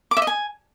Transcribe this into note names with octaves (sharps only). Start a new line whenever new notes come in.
D6
E5
D#5
G#5